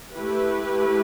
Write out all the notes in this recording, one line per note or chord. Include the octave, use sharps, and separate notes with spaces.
A3 E4 G4 B4